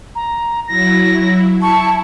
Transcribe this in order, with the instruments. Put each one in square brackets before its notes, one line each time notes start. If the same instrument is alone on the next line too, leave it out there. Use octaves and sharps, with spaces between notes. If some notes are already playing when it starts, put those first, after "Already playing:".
[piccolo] A#5
[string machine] F#3 E4 [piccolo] A#6
[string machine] E4 [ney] A5 [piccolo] C#6